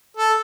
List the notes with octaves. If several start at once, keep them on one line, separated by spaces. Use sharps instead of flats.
A4